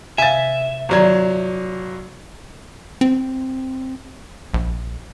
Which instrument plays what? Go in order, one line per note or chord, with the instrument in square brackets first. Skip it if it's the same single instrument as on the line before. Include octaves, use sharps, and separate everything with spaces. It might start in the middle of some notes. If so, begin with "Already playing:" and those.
[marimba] C3 F5 [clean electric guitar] E5 [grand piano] G#5 A6
[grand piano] G1 F#3 G#6 [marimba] D5 A#5
[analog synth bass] C4
A#1